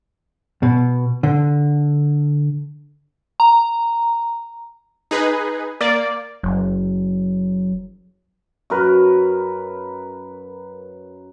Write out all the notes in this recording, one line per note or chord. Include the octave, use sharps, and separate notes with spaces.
B2
D3
A#5
D#4 G#4 B4
A#3 D5
F#1 F#3
F#2 A#4 B4